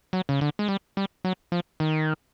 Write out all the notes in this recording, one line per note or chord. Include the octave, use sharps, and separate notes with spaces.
F#3
C#3
D3
G#3
G3
G3
F#3
F3
D#3